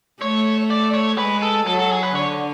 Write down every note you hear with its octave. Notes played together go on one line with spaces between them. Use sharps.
A3 C#5
D5
C#5
G#3 B4
A4
F#3 A4
A4
G#4
B4
D3 C#5